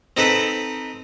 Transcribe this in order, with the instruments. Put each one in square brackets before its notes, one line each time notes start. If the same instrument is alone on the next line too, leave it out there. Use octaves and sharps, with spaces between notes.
[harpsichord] C4 D#4 A4 B4